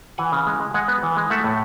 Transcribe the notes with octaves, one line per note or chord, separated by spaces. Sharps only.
E3 F#5 G#5
C#3
G#3
G#3
G#3 F#5 G#5
B3
E3
G#3
A3 E5 F#5
A2